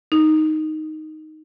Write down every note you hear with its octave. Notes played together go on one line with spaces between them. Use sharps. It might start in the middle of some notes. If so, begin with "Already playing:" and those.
D#4